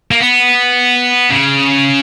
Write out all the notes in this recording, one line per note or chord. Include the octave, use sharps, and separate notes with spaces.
A#3
B3
C#3